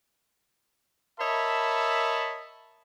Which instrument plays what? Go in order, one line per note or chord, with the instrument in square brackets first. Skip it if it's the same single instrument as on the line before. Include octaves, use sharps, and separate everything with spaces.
[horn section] A#4 C#5 D#5 E5 A5 B5